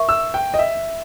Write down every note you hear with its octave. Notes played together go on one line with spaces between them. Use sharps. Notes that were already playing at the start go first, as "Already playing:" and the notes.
Already playing: A#4 E5 C#6
E6
G5
D#5
E5